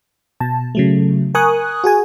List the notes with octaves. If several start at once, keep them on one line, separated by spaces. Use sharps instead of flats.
B2 A5
C#3 F#3 A3
A#4 G#5 C#6 D#6 F#6
F#4 G#4 G#5